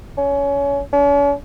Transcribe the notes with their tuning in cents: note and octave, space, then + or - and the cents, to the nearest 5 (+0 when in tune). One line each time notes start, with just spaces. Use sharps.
C#4 +25
C#4 +45